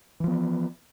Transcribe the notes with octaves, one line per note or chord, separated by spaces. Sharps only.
E3 F3 B3